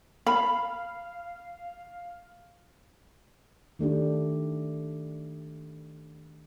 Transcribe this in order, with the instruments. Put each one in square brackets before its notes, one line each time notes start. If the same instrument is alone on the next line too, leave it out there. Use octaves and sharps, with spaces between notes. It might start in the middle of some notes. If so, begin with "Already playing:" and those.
[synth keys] F5 [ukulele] B5
[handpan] D#3 A3 D4 G4